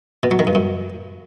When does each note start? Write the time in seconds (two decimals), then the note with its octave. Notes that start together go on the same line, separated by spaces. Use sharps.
0.23 B2
0.31 F#3
0.39 D#3
0.47 G2
0.55 F#2